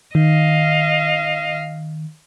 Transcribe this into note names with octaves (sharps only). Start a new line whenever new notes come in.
D#3 D#5 F5